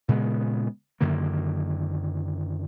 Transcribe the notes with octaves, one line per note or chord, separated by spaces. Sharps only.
A#2 C#3 G#3 B3
F#2 D3 D#3 A#3